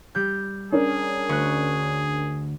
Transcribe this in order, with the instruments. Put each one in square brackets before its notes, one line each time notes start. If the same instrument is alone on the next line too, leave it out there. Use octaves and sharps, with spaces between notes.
[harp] G3 G6
[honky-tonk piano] C#4 D4 A#4 [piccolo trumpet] G#4
[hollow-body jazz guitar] D2 [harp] C#6 F#6